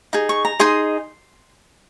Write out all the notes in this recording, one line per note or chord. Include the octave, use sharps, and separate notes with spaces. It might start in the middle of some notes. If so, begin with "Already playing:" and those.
D#4 G#4
C#6
A#5
D#4 G#4 D#5 C6